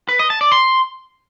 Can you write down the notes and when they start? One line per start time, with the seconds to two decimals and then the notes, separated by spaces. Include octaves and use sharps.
0.09 B4
0.19 D#5
0.30 A5
0.41 D5
0.52 C6